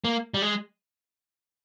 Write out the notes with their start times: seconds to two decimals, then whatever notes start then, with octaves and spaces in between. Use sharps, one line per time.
0.04 A#3
0.34 G3
0.42 G#3